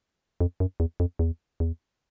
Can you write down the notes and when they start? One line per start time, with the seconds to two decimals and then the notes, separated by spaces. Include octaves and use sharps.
0.40 F2
0.60 F#2
0.80 E2
1.00 F2
1.19 E2
1.60 E2